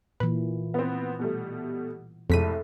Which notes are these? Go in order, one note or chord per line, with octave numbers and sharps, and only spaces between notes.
A#2 E3 B4
B3 C4
B2 G3 A3
C2 F2 A2 G#3 A4 B6 D#7